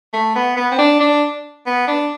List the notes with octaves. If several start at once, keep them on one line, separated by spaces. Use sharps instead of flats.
A3
B3
B3
C4
D4
D4
B3
D4